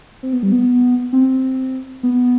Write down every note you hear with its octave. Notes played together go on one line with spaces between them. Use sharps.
C4
B3
G3
B3
C4
B3